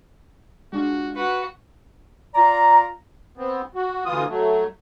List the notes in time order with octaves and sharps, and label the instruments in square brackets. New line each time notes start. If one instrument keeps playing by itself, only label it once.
[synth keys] G#3 D4 F4 [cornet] F#4
[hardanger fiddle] F#4 [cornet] B4
[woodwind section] F4 D5 A#5
[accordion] B3 C4
F#4
D2 E3 F4 D#6
F#3 A3